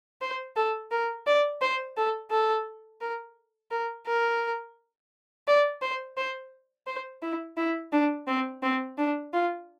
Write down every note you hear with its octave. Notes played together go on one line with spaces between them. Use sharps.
C5
A4
A#4
D5
C5
A4
A4
A#4
A#4
A#4
D5
C5
C5
C5
E4
E4
D4
C4
C4
D4
F4